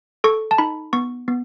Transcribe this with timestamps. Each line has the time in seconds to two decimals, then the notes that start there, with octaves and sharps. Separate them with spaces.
0.24 A4 C#6
0.51 A5
0.58 D#4 B5
0.93 B3 C#6
1.28 B3